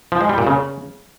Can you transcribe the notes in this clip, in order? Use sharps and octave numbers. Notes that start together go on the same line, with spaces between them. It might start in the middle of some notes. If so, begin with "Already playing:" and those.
F3
G#3
G3
A#2
C#3